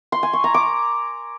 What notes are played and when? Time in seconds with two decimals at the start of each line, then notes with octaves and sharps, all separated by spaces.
0.12 C6
0.23 G#5
0.33 C#6
0.44 A#5
0.54 D6